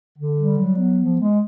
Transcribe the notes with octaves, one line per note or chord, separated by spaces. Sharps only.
D3
G3
F#3
B3
F3
G#3